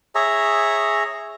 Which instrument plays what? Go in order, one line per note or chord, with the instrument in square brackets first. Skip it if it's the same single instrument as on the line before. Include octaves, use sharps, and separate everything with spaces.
[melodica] G#4 C#5 E5 A#5